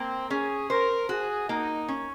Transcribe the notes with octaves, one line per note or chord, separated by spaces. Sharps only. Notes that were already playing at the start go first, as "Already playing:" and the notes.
Already playing: A#3 C4
C#4 G#4
A#4 C5
F#4 G#4
A#3 D#4
C#4